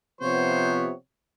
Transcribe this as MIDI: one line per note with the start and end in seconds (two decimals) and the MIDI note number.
0.21 0.91 48
0.21 0.91 53
0.21 0.91 59
0.21 0.92 72
0.21 0.92 73